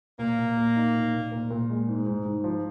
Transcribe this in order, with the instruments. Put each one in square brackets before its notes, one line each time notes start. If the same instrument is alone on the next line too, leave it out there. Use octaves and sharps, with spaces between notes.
[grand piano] A#2 [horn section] A#3
[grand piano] A#2
A#2
D#4
A#2
A#2
A#2
A#2
G#3
G#2
G#2
G#2
F3